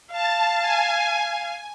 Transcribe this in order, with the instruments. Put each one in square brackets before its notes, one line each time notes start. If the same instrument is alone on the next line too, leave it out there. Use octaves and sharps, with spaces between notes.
[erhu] F5 [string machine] A5
[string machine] G#5